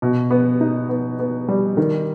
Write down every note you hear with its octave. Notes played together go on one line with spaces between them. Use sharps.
B2
B3
D#4
B3
B3
G3
D#3